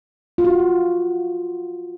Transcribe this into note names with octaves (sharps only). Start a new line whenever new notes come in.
F4
F#4